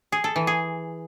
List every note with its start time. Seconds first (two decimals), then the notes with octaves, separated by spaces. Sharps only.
0.12 G#4
0.24 A4
0.36 E3
0.47 G#4